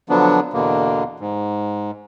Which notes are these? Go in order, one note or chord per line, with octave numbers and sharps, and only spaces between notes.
D3 F3 F#3 B3 D4
E2 B2 D3 A#3
G#2